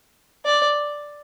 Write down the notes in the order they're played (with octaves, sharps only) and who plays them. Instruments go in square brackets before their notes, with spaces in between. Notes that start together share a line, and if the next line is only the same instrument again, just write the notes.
[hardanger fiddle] D5